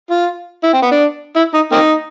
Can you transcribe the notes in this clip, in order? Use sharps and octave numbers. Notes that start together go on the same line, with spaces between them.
F4
E4
C4
B3
D4
E4
D#4
A#3 C4 D#4